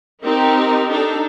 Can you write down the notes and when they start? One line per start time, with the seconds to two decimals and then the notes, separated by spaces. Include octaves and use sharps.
0.23 C4 D#4 G4 A#4
0.89 D4 D#4 A4